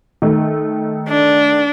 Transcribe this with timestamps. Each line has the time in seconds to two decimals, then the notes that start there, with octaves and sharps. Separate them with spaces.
0.22 D#3 A3
1.09 D4